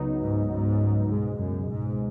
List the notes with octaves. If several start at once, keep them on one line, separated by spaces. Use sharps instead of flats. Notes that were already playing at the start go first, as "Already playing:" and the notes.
Already playing: C#2 C#3 F#3 B3 D#4
G#2
G#2
C#2 G#2 B2 G#3
F#2
G#2